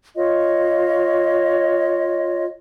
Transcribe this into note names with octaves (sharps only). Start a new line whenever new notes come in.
F4 C#5 D#5